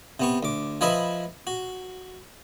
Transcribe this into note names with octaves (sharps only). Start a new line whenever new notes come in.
C3 B3 C#6
D2 D6
F3 G#4 B4 D#5 E5 B5
F#4